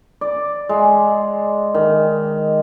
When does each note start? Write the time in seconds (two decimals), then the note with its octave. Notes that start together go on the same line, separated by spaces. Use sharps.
0.21 D5
0.69 G#3
1.74 D#3